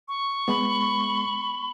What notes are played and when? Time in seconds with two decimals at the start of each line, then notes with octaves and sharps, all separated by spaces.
0.08 C#6
0.48 G#3 B3 B5